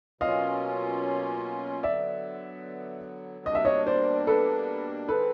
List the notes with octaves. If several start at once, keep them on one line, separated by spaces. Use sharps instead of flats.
B2 F#3 A#3 C#4 F4 D#5 F5
D3 F#3 B3 D5 E5
B2 G3 A#3 D4 D#5
E5
C#5 D#5
C5 D5
A4 B4
D#3 G#3 C4 A4 B4